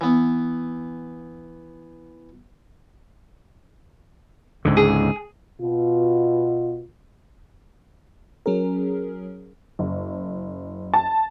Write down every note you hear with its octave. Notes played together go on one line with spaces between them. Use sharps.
E3 B3
C#2 G#2 D3
G#4
B2 F4
F#3 C#4 G#4 A#4
F#1
A5